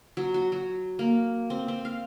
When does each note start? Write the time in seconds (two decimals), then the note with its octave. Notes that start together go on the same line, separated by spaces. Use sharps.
0.17 F#3
0.34 F#4
0.52 F#3
0.99 A#3
1.50 C4
1.68 C4
1.85 F5